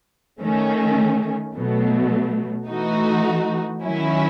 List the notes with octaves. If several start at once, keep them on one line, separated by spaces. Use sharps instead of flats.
D#3 A3 C#4
B2 F#3 A3
E3 A3 D#4 F#4
D#3 F#3 C#4 E4